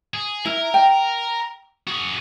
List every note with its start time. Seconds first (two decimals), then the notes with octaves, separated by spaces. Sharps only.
0.14 G#4
0.46 E4 A#4
0.74 G5
1.87 F#4 G#4